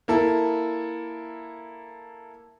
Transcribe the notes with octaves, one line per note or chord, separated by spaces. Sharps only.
A#3 E4 A4